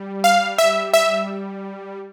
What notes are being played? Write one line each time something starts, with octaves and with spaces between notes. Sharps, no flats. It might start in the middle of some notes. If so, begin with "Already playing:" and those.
Already playing: G3
F5
E5
E5